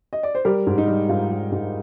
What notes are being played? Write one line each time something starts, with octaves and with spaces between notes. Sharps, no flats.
D#5
D5
C5
G3 G4 A#4
G#2
D#4
G3
G#2 F4
G3
G#2